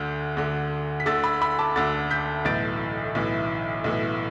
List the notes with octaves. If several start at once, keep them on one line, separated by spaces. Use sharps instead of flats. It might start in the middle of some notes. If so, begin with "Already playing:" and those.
Already playing: D2 D3 G6
D2 D3
B6
D2 D3 E6 A6
B5 E6
B5 E6
A5 D6
D2 D3 E6 A6
G6 B6
B1 A2 E3 A6 D7
B1 A2 E3
B1 A2 E3